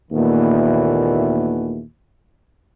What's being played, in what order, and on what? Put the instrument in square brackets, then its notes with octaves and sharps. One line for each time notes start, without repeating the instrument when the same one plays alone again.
[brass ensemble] D#2 A#2 D#3 E3 A3 B3